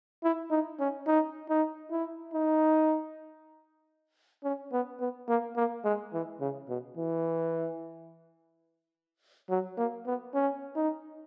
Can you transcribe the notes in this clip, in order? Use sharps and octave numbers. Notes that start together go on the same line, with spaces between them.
E4
D#4
C#4
D#4
D#4
E4
D#4
C#4
B3
B3
A#3
A#3
G#3
E3
C#3
B2
E3
F#3
A#3
B3
C#4
D#4